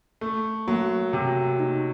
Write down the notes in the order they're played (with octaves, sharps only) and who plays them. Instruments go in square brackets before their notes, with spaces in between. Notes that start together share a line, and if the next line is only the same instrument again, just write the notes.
[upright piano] A3 [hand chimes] A4
[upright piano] F#3 [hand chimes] A#3
[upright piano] C3 [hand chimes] F#4
[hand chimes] D#4